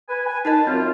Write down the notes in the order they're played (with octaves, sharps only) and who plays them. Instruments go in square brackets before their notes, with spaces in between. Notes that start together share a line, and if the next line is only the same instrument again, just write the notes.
[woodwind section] B4 G#5
G#5
[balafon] D#4 A#4 D#5 [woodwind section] A5
[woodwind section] F#2 F4 [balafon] C4